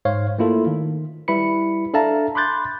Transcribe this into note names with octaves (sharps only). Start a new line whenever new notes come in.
G#2 C5 C#5 F5
A3 A#3 E4 F4 A4
D#3
G3 E4 B4 B5 C#7
D4 A4 E5 F5 A5 A#5
B5 C6 D6 F#6 G6 A6